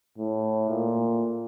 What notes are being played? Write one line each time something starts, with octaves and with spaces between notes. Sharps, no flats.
A2
A#2